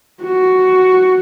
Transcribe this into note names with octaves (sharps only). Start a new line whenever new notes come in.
F#4